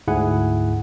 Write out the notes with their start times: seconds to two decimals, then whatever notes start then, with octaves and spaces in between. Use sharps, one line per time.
0.08 D2 G#2 E4 G#4 F#5 G#5